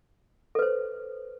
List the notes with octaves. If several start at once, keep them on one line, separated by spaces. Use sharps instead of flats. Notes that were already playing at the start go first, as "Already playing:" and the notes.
A4 B4 C5